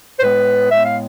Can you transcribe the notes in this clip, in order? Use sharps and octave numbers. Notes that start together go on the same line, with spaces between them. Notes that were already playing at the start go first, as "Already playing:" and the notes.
C5
A2 G#3 B3 B4
A2 G#3 B3 E5
F5